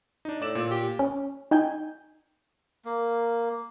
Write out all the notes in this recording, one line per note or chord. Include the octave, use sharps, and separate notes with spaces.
D4 D#4
A2 D5 E7
A#2
G4
C#4
D#4 G5 G#5 G6
A#3